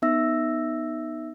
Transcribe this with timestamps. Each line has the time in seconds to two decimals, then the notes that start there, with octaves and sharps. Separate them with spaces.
0.02 B3 D#4 E5 E6 A#6